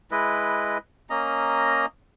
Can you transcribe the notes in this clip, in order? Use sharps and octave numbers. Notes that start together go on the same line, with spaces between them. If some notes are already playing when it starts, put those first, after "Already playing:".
G#3 E4 B4 D#5
A#3 C#4 D#5 A#5